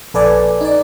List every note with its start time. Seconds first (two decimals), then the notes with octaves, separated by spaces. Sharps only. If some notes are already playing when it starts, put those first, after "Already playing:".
0.14 A#1 A4 B4 D5 G#5
0.61 D#4 D5